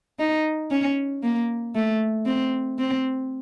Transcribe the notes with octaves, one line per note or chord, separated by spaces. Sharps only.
D#4
C#4
A#3
A3
C4
C4